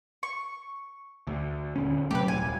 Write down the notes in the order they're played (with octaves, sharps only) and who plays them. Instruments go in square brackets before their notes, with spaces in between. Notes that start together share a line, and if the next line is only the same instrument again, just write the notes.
[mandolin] C#6
[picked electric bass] D2
D#1 D3 C#4
[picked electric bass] C3 F#3 A3 [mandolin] G4 B4
[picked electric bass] D#1 C2 [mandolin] G#5